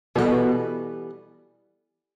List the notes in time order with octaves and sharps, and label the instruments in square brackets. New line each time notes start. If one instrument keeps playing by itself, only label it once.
[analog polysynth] B2 [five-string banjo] E3 G3 B3 D4 A4